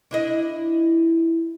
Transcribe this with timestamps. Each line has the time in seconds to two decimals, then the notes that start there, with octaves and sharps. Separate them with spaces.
0.11 D4 E4 D#5